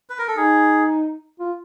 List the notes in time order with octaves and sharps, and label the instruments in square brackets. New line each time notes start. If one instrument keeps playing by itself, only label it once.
[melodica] B4
A#4
A4
[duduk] D#4 [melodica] G#4
[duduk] F4